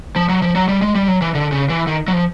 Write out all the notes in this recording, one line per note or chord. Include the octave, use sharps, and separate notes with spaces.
F3
F#3
F3
F#3
G3
G#3
G3
F#3
E3
D3
C#3
E3
D#3
F#3
F3